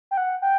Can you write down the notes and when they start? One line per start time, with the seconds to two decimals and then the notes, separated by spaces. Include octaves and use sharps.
0.11 G5
0.17 F#5
0.42 G5